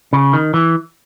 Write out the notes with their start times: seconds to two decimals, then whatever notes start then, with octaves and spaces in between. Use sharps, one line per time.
0.13 C#3
0.33 D#3
0.54 E3